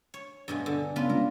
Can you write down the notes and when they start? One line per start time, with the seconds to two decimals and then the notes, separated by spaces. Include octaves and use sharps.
0.14 C#5
0.48 G2 B2 G#3
0.66 D3
0.96 C#3 B3 C#4 D4 F4 B4
1.10 G#3 B3 F4 A#4